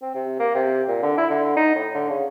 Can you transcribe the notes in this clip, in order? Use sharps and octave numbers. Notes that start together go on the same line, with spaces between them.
C4
C3
A#3
C3
A#2
D3
E4
D3
D#4
A2
D3
C#3